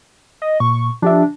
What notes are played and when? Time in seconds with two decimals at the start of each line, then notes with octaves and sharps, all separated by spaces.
0.42 D#5
0.60 A#2 C#6
1.02 F3 D4 G4 E5